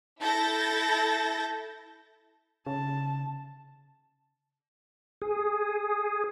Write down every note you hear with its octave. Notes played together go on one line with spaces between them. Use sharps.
E4 A4 G6 A6 A#6
C#3 A5
G#4